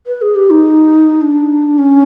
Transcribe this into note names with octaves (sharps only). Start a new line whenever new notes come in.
B4
G#4
G4
D#4
D4
C#4